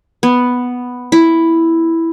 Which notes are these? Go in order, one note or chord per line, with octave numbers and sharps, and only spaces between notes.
B3
E4